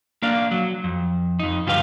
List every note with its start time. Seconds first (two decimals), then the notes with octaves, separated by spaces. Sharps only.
0.22 A#3 D4 D5 F5
0.51 F#3
0.84 F2
1.39 F2 D#4
1.66 D2 G2 F4 G4 B4 F5